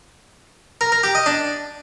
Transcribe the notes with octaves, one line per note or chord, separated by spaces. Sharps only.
A#4
A#4
G4
D#5
D4